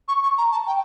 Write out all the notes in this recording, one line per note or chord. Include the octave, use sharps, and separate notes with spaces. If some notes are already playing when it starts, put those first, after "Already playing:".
C#6
C#6
A#5
A5
G5